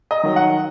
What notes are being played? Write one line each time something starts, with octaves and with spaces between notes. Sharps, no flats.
D#5
D#3 F#3
F#5